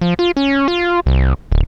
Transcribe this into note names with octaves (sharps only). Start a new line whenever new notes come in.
F3
F4
C#4
F4
C2
D1